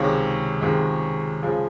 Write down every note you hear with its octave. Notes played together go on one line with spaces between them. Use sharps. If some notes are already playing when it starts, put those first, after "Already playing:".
Already playing: C#2 C3 D#3 G#3 C#5
C#2 C3 D#3 G#3
C#2 C#3 F3 G#3